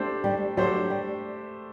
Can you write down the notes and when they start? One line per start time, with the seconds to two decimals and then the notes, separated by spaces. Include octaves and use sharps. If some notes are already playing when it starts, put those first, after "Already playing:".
Already playing: A3 D4 G4 C5
0.24 G3
0.57 F#3 A3 D4 G4 C5
0.90 G3